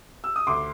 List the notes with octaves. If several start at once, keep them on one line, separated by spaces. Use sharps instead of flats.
E6
D#6
D2 C6 D6